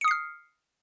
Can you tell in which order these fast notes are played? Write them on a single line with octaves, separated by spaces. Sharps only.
C#7 D#6 C7 F6